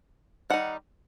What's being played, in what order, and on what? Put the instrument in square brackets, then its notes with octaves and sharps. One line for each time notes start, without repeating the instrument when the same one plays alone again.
[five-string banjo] D#3 G3 D#4 F#5